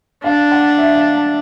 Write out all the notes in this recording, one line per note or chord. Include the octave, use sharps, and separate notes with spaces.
D4 F5
F#5
E5
F5
A5